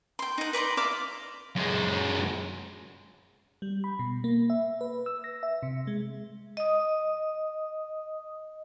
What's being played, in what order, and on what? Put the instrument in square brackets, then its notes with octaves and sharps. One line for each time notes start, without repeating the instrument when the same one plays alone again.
[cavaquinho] G5 C6
D#4 F#5
B4 D5 A#5 C6
D5 E5 F5 D6
[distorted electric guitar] F#2 G#3
[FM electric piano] G3
B5
B2
A#3
E5
B4
E6
A#6
E5
C3
G#3
[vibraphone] D#5 D#6